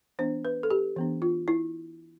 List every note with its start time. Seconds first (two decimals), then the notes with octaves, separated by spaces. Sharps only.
0.19 E3 B3 D4 C5
0.45 B4
0.63 A4
0.70 G4
0.96 E3 B3 D4
1.22 F4
1.48 E4